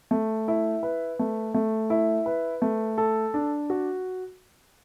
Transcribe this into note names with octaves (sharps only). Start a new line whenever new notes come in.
A3
E4
B4
A3
A3
E4
B4
A3
A4
D4
F#4